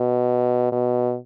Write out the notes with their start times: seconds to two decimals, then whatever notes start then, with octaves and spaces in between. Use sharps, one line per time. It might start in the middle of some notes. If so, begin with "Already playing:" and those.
Already playing: B2
0.72 B2